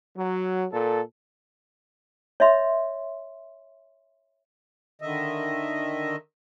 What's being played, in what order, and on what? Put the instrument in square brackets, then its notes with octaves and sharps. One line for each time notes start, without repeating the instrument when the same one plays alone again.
[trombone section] F#3
A#2 A4
[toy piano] C#5 D#5 E5 C6
[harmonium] D3 D#3 D#5 E5